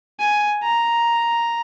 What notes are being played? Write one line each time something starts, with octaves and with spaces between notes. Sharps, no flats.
G#5
A#5